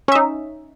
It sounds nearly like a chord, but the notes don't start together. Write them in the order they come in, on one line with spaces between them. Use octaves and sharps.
C#4 E5 D#4